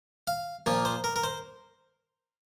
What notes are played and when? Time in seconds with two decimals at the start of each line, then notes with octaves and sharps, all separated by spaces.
0.27 F5
0.66 A#2 F3 A#3
0.85 C5
1.04 A#4
1.16 A#4
1.24 C5